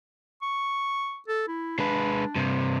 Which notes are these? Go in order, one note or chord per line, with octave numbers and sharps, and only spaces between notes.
C#6
A4
E4
G#3 D4 B4
G2 C3